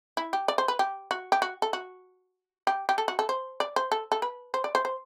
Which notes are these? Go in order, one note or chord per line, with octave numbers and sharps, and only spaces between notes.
E4
G4
D5
C5
B4
G4
F#4
G4
F#4
A4
F#4
G4
G4
A4
F#4
A4
C5
D5
C5
A4
A4
B4
C5
D5
C5
C5